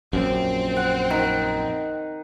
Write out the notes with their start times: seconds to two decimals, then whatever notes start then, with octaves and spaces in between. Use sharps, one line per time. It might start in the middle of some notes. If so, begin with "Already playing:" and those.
0.13 A#1 F#2 C4
0.77 F#5
1.10 D#3